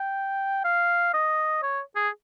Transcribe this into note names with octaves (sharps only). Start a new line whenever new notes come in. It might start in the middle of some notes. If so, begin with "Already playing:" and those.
Already playing: G5
F5
D#5
C#5
G#4